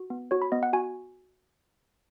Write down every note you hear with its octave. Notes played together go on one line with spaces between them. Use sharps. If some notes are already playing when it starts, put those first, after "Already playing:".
Already playing: F#4
B3
F#4 C#5
B5
B3 D#5
F#5
F#4 G#5